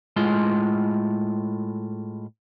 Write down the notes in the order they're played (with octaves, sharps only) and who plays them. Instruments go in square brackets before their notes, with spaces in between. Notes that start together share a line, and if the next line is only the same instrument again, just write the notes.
[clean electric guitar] A2 G#3 F4 C6